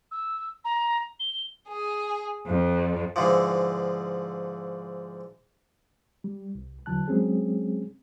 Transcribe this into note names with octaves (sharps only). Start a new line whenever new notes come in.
E6
A#5
G7
G#4
F2
G#2 D3 E3 F3
G3
C2
E2 D3 E3 F#3 A5 F#6
F#3 G#3 C4 C#4 G#4